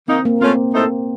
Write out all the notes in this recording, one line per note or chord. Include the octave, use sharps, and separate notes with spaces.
D#3 A#3 C4 D#4
A#3
A3 C4 C#4 F4 A#4
A2 A3 D#4 A4 C5